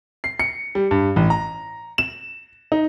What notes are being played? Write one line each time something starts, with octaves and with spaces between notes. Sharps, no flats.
C7
C#7
G3
G2
A1
A#5
E7
D#4